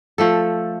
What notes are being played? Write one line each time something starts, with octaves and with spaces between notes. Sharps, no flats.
F3 A3 A4